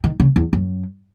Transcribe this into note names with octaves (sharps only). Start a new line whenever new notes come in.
D#3
C#3
E2
F#2